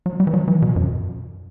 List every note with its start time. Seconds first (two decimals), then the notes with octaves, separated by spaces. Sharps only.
0.06 F#3
0.20 G3
0.27 E3
0.34 F#3
0.48 E3
0.62 B2
0.76 F#2